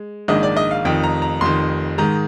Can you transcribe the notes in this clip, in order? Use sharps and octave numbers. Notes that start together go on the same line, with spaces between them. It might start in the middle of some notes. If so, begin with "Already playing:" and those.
Already playing: G#3
A#1 G#2 D#3 G#3 D4 D#5
D5
D#5
F5
F1 F2 D#3 G5
A#5
A#5
F1 F2 D#3 C6
G#2 D#3 G#3 A#5